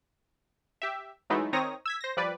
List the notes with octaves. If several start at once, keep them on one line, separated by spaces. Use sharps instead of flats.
G4 E5
E3 F#3 G#3 A3 D#4 E4
D#3 C4 C#5 A#5 D#6 A#6
E6 G#6 B6
C5 A#6
F3 G3 B4 D5